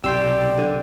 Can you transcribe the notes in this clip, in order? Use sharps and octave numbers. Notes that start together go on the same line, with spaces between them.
B1 C3 G4 D5 G5 C6 E6
D3